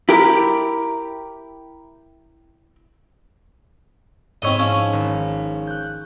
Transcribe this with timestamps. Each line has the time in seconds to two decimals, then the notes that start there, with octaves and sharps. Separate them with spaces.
0.09 E4 G4 A#4
4.42 G#2 C4 E4 C#5 D#5 E6
4.59 F3 C#4
4.93 G#1
5.67 F#6 G6